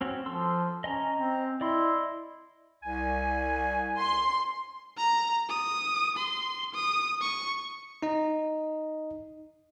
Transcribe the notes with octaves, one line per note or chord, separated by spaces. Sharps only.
C4 C#4 F#4
F3 A4 C6 E6
C#4 D#5 G#5 A#5
C4
E4 D5 D#5 C6
C2 G#5
C6
A#5
D#6
C6
D#6
C#6
D#4 D#5